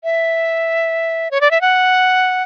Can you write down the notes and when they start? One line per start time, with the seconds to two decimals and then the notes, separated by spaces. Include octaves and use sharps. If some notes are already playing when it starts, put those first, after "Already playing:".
0.04 E5
1.31 C#5
1.41 D5
1.51 E5
1.61 F#5